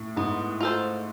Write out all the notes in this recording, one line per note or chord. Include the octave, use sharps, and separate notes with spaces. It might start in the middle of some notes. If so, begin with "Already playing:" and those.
Already playing: A2
G#2 B3
F4 A4 C5